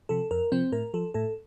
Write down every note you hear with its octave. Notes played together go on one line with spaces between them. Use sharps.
C3 F3 A4
F2 A#4
C3 F3 C4 C5
A2 A#4
F3 A4
A2 A4